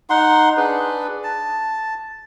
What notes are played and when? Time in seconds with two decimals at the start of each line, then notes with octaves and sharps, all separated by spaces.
0.10 D#4 F#5 C6
0.57 D4 G#4 B4
1.23 A5